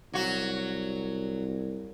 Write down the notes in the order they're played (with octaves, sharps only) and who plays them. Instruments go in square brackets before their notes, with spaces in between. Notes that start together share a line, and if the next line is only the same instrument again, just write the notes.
[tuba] C2 [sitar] F#3 F#4